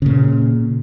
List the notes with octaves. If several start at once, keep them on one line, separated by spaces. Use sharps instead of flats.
A#2 C#3